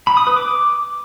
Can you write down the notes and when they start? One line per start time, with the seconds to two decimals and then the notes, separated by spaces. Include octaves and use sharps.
0.07 B5
0.17 D#6
0.27 B4
0.37 D6